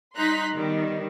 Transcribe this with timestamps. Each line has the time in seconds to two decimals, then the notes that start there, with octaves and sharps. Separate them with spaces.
0.16 G3 D#4 A#5 C6 F#6 B6
0.53 D#3 G3 B3